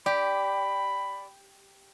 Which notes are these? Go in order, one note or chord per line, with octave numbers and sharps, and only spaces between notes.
G4 D5 B5